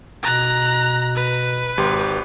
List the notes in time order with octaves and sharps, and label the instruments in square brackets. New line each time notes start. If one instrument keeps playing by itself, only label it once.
[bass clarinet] B2 [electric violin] A#5 F#6
[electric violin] B4
[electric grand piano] G#1 G4 C6